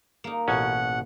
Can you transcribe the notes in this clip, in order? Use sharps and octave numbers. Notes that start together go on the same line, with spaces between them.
A#3 D#4
A1 B2 C#4 F#5